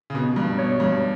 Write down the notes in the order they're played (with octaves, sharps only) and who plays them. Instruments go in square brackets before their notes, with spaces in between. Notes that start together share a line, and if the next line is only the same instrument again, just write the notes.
[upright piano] C#3
B2
G2
[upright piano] B2 [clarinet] C#5
[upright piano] G2